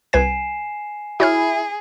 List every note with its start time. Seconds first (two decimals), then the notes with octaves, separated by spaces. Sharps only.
0.13 C2 B4 G#5 G#6 C7 E7
1.20 E4 F#4 G#4 C#5 F6